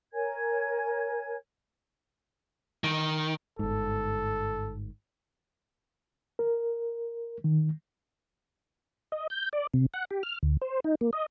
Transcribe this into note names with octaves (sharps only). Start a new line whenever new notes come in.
A#4 C#5 G#5 G#6
D#3
G1 G#2 A4
A#4
D#3
D#5
G6
D5
C3
F#5
G4
F6
D2
C5
D#4
A#3
D#5